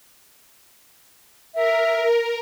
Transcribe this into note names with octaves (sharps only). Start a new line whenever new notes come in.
A#4 E5